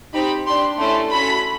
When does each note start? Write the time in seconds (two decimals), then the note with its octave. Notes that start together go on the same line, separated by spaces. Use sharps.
0.13 C4 D#4 G4 B5
0.46 D4 G4 C6
0.79 A3 C#4 E4 A4 C6
1.12 C#4 F#4 A4 B5